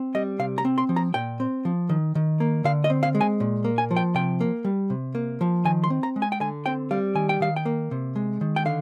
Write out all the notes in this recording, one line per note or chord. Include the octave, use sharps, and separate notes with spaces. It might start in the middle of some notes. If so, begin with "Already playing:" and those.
Already playing: C4
G3 D#5
C3 F5
A#5
C4
C6
F3
A#5
A#2 G5
C4
F3
D#3
D#3
A#3
D3 F5
D#5
C4
F5
G#3
G#5
A#2
A#3
G#5
F3
G5
C3 G5
A#3
G3
C3
A#3
F3
D#3 G#5
C6
C4
A#5
G#3
G#5
G5
D3 G#5
C4 G5
G3 F5
D#3 G#5
G5
D#3 F5
G5
A#3
C3
G#3
D#3
G5
D3 F5